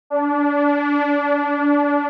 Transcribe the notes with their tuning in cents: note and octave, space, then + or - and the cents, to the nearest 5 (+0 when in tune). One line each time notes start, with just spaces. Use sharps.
D4 -25